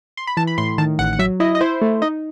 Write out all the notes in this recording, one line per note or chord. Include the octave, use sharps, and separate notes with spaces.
C6
B5
E3 A5
B5
A2 C6
D#3 A5
A1 F#5
F#5
F#3 E5
E4 D#5
D#5
E4 C5
A3
D#4 D#5